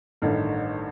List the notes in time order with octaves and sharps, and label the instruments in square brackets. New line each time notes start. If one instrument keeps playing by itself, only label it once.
[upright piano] A1 G2 D#3 A3